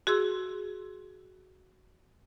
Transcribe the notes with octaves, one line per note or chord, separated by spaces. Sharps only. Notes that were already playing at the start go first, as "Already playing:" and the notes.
F#4 G#4 C6 E6